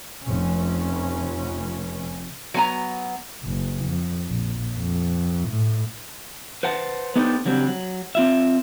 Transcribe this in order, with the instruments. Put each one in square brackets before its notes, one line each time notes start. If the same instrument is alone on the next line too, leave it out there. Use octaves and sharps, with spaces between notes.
[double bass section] F1 C#4
[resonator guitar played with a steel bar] F#3 B3 G#5 A#5
[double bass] F#1
F2
A#1
F2
A2
[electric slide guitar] B4 C5 F#5 A5
B3 D4 D#4 G4 A4 C5
C#3 F#3 G3 C4 D4
F#3
C4 F4 E5